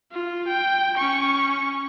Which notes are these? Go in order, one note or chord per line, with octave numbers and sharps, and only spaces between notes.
F4
G5
C#4 C#6